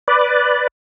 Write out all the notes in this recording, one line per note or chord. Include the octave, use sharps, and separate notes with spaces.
B4 D5